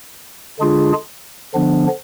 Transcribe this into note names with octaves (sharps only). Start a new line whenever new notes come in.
D3 G#3 D4 F4 G#4
D3 F3 B3 D4